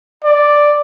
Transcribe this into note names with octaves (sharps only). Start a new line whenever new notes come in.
D5